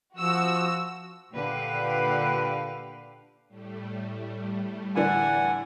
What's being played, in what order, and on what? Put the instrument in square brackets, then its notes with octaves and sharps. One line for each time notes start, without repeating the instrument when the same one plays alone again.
[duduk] F3 [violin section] F#4 E6
[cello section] A#2 D3 G4 B4 F5
[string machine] A2 G3 A3
[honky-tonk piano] D3 E3 D4 [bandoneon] F#5 G#5